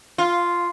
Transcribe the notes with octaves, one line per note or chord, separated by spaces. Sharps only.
F4